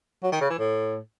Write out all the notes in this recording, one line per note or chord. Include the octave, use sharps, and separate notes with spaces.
F#3
D#3
C#3
E3
A2